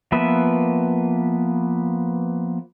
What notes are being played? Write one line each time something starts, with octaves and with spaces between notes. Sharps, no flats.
F3 A#3 B3 B4 E5